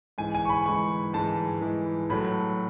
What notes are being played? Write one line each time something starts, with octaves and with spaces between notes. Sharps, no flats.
G#2 E3 G#3 G#5
G#5
C#6
B5
G#2 E3 G#3 C#6
G#2 E3 G#3 A5
G#2 E3 G#3
A2 F#3 A3 B5